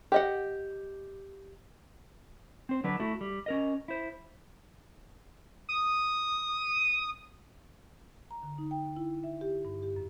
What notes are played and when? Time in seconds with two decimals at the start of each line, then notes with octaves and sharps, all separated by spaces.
0.12 G4 D#5 F#5
2.69 C4 C5
2.84 D3 F#3 D4 B4
3.00 A3 E4 F#4 A4
3.21 G3
3.46 C#4 A#4 D#5
3.88 E4 C5
5.69 D#6
8.31 A#5
8.43 D3
8.58 D#4
8.71 G5
8.96 E4
9.24 E5
9.41 G4
9.65 G2
9.83 G4
9.96 F#2